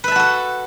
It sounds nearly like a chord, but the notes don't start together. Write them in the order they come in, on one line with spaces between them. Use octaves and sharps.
B4 E5 A5 F#4 A4